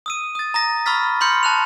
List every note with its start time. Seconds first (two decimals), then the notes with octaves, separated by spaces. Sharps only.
0.06 D#6 E6 D#7
0.35 D#6 A6
0.54 A#5 D#6 A#6
0.86 B5 C#6 E6 F6 A6 B6
1.21 B5 C6 F6 G6 C#7
1.43 A5 F#6 F7